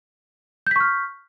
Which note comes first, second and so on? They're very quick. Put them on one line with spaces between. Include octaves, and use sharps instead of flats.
G6 B6 C#6 F6